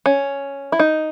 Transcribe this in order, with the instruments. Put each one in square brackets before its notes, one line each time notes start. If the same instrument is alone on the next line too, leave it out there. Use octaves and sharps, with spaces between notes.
[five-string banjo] C#4
E4
D#4